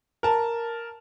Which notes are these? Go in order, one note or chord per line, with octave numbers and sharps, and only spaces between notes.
A#4 A5